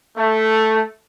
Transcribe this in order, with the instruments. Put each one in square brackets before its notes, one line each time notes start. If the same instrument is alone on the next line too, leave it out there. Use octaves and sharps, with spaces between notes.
[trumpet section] A3